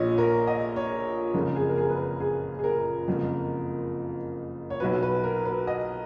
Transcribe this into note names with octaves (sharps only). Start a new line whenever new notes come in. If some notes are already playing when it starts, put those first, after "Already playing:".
Already playing: A#1 A#2 F3 C#5 D#5
A#4
D#5
C#5
F#1 F2 C#3 F3 A#4
G#4
A#4
G#4
B4
A#4
G#4
G#4
A#4
F#1 F2 F3
C#5
B1 B2 F#3 B4
B4
A#4
B4
D#5